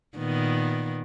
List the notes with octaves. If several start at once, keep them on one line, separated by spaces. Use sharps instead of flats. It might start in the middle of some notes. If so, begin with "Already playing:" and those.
A#2 D#3 B3